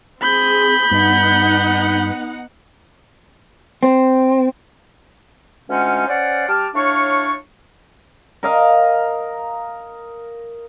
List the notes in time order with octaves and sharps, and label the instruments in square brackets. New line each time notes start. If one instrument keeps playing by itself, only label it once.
[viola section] C4 G#4 [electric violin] B5 G6
[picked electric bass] G2 [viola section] B3 D#4 F#5
[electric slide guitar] C4
[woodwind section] D2 G#3 C#4 D#4 F4 F#5
C#4 C5 D5 F5 F#5
G3 G5 A5 D6 F6
A2 D4 C#5 F5 C#6
[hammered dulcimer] A#4 D#5 F5